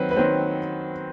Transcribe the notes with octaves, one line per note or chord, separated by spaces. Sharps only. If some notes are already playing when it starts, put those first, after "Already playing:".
Already playing: D#3 F#3 C4 B4
B4
D#3 F#3 C4 C5